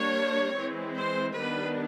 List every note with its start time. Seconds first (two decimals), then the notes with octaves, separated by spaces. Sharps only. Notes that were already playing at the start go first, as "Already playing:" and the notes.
Already playing: G3 A#3 D4 C#5
0.57 E3 G#3 C4
0.97 C5
1.36 D#3 G3 B3 D4 B4